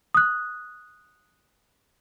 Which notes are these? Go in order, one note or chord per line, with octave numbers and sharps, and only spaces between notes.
D#6 F#6